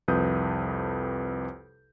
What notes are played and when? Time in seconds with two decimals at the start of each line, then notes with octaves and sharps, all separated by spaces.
0.08 C2 F2 B4 D#6 G6